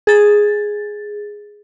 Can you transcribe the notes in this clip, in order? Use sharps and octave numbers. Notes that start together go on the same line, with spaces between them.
G#4 A6